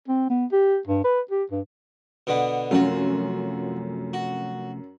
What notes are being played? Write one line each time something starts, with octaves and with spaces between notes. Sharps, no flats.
C4
B3
G4
G2
B4
G4
G2
B2 D3 B3
F#2 C3 F3 A3 F4 F#4
F#4